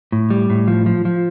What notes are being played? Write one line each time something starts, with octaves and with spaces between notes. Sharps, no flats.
A2
G3
A2
F3
F3
F3